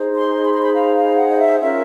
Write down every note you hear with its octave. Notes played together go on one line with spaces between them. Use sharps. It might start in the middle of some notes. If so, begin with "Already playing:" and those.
Already playing: D#4 G#4 C5
C6
B5
C6
B5
F5
F5
F#5
D#5
E5
C#4 F4 A#4 C#5 E5